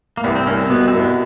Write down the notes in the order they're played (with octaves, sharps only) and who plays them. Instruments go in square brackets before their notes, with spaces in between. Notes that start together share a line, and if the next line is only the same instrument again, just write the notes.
[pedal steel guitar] A#3
[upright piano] C2 [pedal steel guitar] B3
[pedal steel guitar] C4
[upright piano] C2 [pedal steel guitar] C#4
[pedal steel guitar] C4
[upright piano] B2 [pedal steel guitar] B3
[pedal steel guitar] C4
[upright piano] C2 [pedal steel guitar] B3